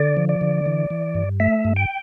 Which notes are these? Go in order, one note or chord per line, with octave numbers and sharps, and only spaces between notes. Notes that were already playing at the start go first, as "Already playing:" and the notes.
Already playing: D3 D5
F3
D5
D3
E3
E3
G2
A3 E5
G2
G5